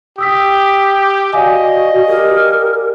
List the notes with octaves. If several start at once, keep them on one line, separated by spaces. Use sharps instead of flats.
G4 D#6 E6 B6
F#4 D5 D#5 F5 G#5
G4 A#4